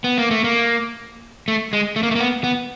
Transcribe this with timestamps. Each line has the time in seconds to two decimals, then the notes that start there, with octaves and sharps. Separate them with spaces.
0.04 B3
0.18 A#3
0.31 A3
0.44 A#3
1.48 A3
1.73 G#3
1.96 A3
2.03 A#3
2.11 A3
2.16 A#3
2.20 B3
2.44 B3